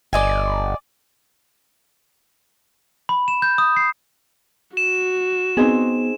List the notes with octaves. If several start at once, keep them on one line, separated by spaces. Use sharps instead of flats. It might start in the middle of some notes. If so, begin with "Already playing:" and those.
G1 D5 D#5 G#5
B5
E7
G6
D#6
C7
F#4 E7
B3 C4 D#4 G#4